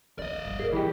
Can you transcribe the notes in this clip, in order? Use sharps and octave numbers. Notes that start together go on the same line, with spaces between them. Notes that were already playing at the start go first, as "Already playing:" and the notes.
D#2 D5 D#5
G1
A#2 G#4 A#4
E3 G4